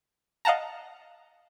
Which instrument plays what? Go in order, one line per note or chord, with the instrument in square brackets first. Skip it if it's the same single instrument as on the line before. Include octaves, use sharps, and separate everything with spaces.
[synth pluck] D#5 F5 F#5 A5 A#5